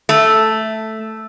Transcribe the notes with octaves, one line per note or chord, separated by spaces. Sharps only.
A3